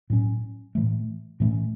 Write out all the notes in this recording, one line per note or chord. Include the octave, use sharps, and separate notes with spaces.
A2 F#3 C#4
A2 E3 A3
A2 E3 A3 C#4